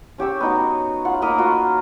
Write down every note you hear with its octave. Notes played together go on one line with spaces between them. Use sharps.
C#4 G4 C#5 E6
B3 D#4 F#4
F4 F#5
A#3 A#4 D#5 B5
F4 F#4 D#5